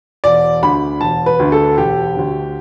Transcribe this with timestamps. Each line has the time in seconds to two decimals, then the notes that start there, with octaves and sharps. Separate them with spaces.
0.24 E1 D5
0.63 D2 D3 B5
1.01 E1 A5
1.26 B4
1.39 D2 D3
1.52 A4
1.78 E1 G4
2.16 D2 D3